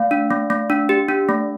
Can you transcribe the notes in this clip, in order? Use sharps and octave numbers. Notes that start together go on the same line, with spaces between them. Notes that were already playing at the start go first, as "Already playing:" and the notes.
Already playing: A3 F5
D4
A3
A3
D4
G4
D4
A3